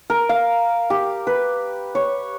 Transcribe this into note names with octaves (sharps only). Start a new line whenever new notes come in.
A#4
F5
G4
B4
C#5